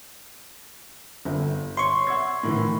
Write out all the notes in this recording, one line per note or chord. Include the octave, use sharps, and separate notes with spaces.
G1
C#5 C6 C#6
F#5 E6 G#6
A2 D#3 E3